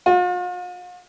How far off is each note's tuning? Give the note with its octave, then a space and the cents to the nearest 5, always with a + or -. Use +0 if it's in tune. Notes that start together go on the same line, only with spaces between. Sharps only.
F4 +45